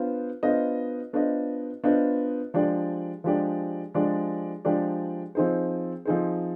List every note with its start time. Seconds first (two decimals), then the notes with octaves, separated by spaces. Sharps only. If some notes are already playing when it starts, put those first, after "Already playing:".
Already playing: B3 D4 F4 C5
0.43 B3 D4 F4 C5 D#5
1.13 B3 D4 F4 C5 D#5
1.84 B3 D4 F4 C5 D#5
2.54 F3 G#3 D4 G4 D5
3.24 F3 G#3 D4 G4 D5
3.94 F3 G#3 D4 G4 D5
4.65 F3 G#3 D4 G4 D5
5.35 F3 C4 D#4 G#4 C5
6.05 F3 C4 D#4 G#4 C5